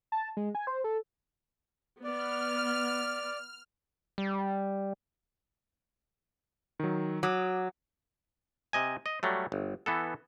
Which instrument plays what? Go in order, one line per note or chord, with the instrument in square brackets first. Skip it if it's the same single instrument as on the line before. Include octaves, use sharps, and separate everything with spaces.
[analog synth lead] A5
G#3
G#5
C5
A4
[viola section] B3 [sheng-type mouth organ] D5 [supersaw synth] F6
[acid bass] G3
[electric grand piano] D#3 F#3
[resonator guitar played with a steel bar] F#3 [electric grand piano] D6 D#6
[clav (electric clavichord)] C3 D#5 G#5
D#5
F#3 G3 A3
G1
E3 B3 A4